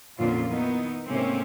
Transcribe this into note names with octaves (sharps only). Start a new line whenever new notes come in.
F2 A#2 D3 A#3 C#4 F4
D#3 B3 D#4 E4
G#2 C3 A3 A#3 C4 C#4